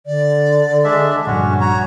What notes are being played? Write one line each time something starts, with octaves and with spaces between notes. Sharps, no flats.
D3 D5
G#3 D4 E5
A#1 G2 C#4 F#4 F#5
F#4 C#5 A#5